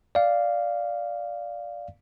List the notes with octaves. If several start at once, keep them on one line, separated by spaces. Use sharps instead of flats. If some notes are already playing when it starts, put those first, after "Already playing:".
D5 F5